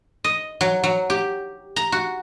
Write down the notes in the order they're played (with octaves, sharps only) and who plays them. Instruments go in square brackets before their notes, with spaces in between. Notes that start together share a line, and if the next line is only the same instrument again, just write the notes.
[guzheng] D#5
F#3
F#3
G4
A#5
F#4